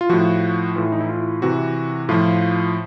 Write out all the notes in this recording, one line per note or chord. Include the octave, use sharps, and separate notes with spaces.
F4
A2 F3 F#4
A2 E3 F4
D#4
E4
F4
C3 E3 F#4
A2 F3 F4